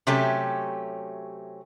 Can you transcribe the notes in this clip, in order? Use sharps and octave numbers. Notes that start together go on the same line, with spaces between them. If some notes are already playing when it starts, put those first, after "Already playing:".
C3 F#3 A3 C#4 G4